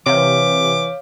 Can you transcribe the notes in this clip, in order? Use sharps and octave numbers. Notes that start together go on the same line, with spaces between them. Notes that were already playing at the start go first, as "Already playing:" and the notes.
C3 E3 C#5 F5 D6